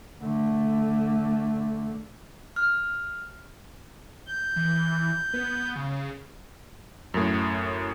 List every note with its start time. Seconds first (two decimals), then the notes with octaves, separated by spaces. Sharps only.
0.23 D3 A3
2.56 F6
4.27 G6
4.56 E3
5.34 B3
5.76 C#3
7.14 F#2 A2